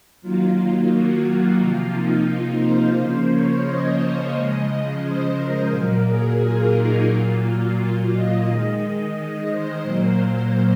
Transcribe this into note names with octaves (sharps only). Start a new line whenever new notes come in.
D#3 F#3 A#3 F4
F#4
C3 F3 A#3 F4
D#4
F4
C5
C#3 F3 A#3
C#5
D#5
C#3 F3 G#3 D#5
C5
A#4
A#2 F#3 A#3
G#4
F4
D#4
A#2 F#3 A#3 F4
F4
D#5
D#3 G#3
C5
A#2 F#3 A#3